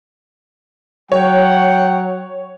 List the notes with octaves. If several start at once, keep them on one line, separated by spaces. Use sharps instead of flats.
F#3 C#5 F#5 G5